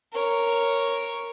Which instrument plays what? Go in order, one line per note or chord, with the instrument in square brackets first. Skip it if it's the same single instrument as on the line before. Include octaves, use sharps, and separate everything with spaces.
[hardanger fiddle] A#4 C#5